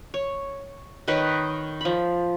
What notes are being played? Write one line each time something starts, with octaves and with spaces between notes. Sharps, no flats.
C#5
D#3 D#4 B4 C#5
F3 B5